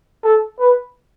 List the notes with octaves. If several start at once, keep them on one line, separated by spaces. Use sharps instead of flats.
A4
B4